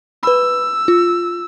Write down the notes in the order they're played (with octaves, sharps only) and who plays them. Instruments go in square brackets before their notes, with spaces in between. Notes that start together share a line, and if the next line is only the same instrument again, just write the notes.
[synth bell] B4 B5 [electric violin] E6
[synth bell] F4